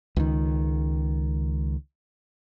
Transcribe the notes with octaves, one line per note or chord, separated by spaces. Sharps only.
C#2 D#3